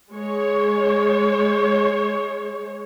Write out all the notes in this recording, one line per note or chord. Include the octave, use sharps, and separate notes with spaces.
G#3 C#5